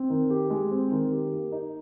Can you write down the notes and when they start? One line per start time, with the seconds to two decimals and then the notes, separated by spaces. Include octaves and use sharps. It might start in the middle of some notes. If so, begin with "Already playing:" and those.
Already playing: C4
0.10 D#3
0.30 G4
0.50 G#3
0.71 C4
0.91 D#3
1.12 G4
1.33 A#3
1.52 D#4